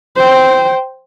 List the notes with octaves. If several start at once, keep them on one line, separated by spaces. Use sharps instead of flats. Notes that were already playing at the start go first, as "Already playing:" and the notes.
C5 G5